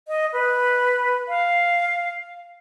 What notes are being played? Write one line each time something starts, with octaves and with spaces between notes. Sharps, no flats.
D#5
B4
F5